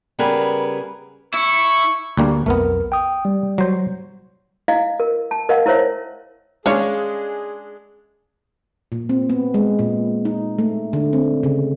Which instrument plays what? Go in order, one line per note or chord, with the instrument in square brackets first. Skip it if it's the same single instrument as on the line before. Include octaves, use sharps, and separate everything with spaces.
[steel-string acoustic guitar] C#3 G3 B3 G#4 A#4 B4
[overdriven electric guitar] E4 [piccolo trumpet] C#6
[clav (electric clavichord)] D2 G3 A#3
[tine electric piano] B1 F2 A#4 [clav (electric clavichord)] A3 B3
[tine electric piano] G5 D#6
G3
[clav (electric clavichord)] F#3 C5
[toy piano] E4 D#5 F5
A#4
A5
A#4 D#5 F5 F#5
E4 A#4 C5 C#5 E5
[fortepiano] G#3 D4 [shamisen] C#4 C#5 F5 [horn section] G#4
[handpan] A#2
C4
B3
G#3
A#2
D#4
A3
D3
C4
C#3